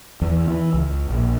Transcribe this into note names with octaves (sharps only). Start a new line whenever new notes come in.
E2
E3
C#2
A#1